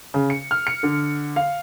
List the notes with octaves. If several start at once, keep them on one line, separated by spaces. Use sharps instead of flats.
C#3
C#7
F6
C#7
D3
F5